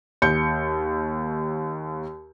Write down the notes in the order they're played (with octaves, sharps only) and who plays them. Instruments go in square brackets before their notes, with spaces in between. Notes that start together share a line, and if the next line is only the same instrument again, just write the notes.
[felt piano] D#2 G6 C#7